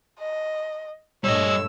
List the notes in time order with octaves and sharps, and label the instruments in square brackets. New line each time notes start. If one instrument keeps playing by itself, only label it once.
[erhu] D#5
[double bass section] A#1 G2 A3 [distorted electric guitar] G3 D#5 [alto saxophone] C#5 [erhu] E6